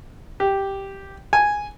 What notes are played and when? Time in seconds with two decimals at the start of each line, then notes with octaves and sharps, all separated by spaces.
0.40 G4
1.33 G#5